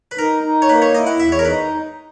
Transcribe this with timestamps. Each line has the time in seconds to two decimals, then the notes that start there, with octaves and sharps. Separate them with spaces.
0.11 B4
0.18 D#4 A#4
0.43 D#4
0.62 C#5
0.69 A#3 B4
0.82 C#5
0.94 E4 D#5
1.07 F#5
1.19 E2 E5
1.32 C#5
1.39 A#4
1.45 D#4 B4